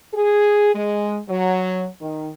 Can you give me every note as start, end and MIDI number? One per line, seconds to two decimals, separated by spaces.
0.14 0.71 68
0.75 1.19 56
1.29 1.85 54
2.01 2.28 51